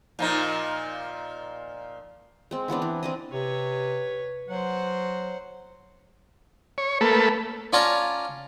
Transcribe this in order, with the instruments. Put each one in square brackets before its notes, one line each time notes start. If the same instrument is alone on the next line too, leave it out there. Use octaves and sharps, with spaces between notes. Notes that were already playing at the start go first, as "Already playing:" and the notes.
[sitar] A#2 F3 D#4
[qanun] G#3 C4
E3 B3 C4 D4
E3
C4 D4 D#5
[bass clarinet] C3 [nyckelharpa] B4 C#5
[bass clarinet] F#3 [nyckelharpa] C5 F#5
[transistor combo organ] C#5
A3 A#3 A4 B4
[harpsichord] C#4 F4 D5 A5 A#5